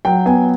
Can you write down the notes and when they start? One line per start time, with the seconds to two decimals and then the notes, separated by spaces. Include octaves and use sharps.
0.05 F#3 G5
0.26 B3 G#5